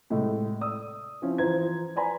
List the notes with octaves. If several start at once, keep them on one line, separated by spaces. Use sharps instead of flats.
A2 C3 G#3 A3
D5 D#6 E6
F3 C4 C#4 E4
E3 F3 C5 A#5 G#6
B4 D5 G#5 A#5 B5